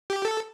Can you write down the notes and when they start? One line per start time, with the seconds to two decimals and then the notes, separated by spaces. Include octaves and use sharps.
0.10 G4
0.25 A4